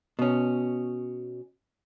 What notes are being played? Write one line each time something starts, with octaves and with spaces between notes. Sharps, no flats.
B2 C#4